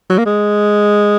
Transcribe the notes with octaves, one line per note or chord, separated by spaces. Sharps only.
F#3
A#3
G#3